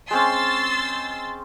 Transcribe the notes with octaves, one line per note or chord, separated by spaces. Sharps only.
G#3 C4 C#4 C6 E6 A6